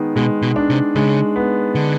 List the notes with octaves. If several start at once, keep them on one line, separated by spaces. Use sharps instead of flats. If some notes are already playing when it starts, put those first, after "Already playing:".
Already playing: D#3 G#3 B3
B2 G#3
B2
D4
C3
C#3 G#3
B3
D3